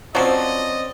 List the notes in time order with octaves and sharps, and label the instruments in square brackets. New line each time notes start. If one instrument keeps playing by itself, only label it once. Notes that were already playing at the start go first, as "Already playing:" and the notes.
[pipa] F3 F#3 [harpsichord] C4 C#4 [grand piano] D5 [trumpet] D#5